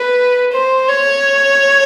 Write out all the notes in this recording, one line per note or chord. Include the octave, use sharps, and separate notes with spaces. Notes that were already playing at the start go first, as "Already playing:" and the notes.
Already playing: B4
C5
C#5